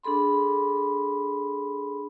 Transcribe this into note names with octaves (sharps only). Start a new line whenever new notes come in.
D4 G#4 A4 B5 C6